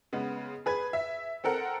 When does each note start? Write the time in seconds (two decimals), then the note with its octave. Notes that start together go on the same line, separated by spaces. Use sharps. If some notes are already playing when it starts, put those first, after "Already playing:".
0.13 C#3 G#3 B3
0.66 G#4 B4 G#6
0.93 E5
1.44 C4 A4 A#4 F#5